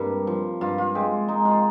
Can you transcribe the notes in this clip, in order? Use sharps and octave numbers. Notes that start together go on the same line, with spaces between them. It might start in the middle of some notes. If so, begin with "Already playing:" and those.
Already playing: G2 C3 G3 A#3
F3
G2 F4
F4
G#3 G4
G#3 D#4
F4